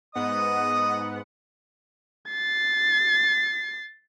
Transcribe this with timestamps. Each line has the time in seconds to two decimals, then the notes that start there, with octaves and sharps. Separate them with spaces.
0.15 G#2 B3 D#5 F#5 D#6
2.30 A6 C7